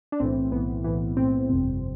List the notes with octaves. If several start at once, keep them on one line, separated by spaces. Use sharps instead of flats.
D4
B1 A2 E3 C4
B1 A2 E3 B3
B1 A2 E3 B3
B1 A2 E3 C4
G1 F2 C3